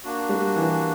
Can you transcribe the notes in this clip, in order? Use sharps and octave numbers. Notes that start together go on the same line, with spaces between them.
A#3 D4 F#4
G3
E3